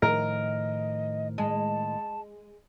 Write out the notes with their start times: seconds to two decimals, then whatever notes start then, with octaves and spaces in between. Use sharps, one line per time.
0.02 A2 D#3 F3 A#4 D#5
1.38 G#3 A5